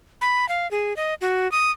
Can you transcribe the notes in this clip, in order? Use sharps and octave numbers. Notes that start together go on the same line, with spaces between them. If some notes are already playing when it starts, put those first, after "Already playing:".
B5
F5
G#4
D#5
F#4
D#6